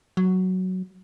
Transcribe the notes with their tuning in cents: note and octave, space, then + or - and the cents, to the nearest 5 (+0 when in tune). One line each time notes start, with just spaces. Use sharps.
F#3 +5